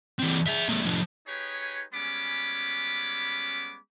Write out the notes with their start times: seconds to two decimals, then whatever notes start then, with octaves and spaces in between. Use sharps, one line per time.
0.20 E3 C4
0.47 G#4 E5
0.69 G#3 A#3
0.83 A2 F3
1.27 D#4 G4 G#4 B4 C#5
1.94 G3 G#3 B3 C#4 B5 D6